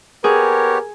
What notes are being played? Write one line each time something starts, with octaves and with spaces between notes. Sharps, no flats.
B3 G4 G#4 A#4 C#5